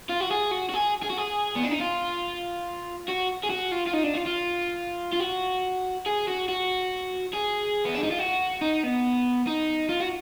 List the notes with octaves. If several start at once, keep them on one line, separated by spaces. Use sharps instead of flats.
F4
F#4
G#4
F#4
F#4
G#4
G#4
F#4
G#4
B3
D4
D#4
F4
F#4
G#4
F#4
F4
F4
D#4
D4
F4
F4
F4
F#4
G#4
F#4
F#4
G#4
B3
D4
D#4
F4
F#4
D#4
B3
D#4
F4
F#4